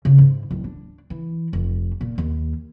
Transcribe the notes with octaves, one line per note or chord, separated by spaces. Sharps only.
C#3
G#2
D1
D4
E3
F1
A#2
D#2